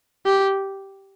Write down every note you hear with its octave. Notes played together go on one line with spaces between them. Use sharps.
G4